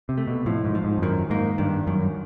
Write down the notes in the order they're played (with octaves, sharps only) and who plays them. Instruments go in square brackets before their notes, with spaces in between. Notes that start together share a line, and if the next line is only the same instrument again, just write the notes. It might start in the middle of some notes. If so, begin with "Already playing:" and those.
[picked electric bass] C3
[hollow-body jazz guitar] A3
[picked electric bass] B2
[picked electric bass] A2 [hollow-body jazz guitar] F3
[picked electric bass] G#2
[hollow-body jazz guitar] F3
[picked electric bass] G#2
F2
[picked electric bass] F#2 [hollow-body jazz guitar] D#3
[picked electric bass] G#2 [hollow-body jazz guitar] A#3
[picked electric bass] G2 [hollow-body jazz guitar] D#3
[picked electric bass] F#2 [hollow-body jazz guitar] D#3